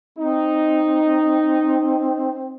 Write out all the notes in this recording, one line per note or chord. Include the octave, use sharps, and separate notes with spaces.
C4 D#4